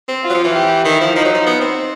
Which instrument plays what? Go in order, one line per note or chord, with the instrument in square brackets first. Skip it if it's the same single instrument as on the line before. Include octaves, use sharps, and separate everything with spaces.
[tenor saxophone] C4
[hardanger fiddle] F4
[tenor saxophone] F#3
F3
E3
[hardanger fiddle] G4
[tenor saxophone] D#3 [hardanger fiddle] E4
[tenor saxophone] F3
[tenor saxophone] F3 [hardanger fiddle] D#4
[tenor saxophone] F#3
F3
B3
C4